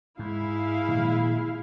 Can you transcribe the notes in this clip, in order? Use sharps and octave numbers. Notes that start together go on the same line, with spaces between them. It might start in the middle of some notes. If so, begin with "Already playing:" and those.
G#2 G#3 E4 F5
A#2 D#3 F3